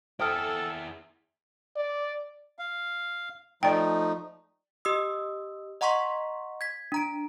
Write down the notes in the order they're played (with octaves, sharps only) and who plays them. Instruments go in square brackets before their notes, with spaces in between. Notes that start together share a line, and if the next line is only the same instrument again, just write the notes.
[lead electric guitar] E4 G#4 [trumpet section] A4 [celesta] C5 D#6 F6 [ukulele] G5
[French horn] D5
[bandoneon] F5
[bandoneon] F3 A3 D#4 [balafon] D5 G5
[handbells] G4 D#5 D#6 E6
D#5 F#5 A#5 C6 C#6 B6
G#6 B6
D4 A#5 D7